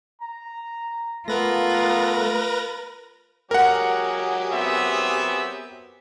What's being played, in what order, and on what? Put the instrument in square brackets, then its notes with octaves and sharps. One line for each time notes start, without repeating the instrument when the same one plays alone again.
[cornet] A#5
[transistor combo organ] A3 [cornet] B3 [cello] F4 [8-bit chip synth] A#4 B4 A#6
[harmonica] F#3 G4 G#4 [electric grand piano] A#4 F#5
[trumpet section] B3 C4 E5